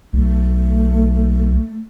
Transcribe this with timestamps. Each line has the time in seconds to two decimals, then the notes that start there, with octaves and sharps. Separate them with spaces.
0.13 B1 A3